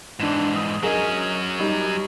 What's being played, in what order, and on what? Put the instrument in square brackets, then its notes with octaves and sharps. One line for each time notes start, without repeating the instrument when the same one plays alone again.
[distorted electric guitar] G#2 E3 [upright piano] D4 E7
[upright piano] D#6
[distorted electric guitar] F#3 C#4 [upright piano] G#4 A#4 D#5
[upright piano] G3 D#4